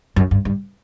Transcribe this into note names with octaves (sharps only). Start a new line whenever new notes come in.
F#2
G2
G2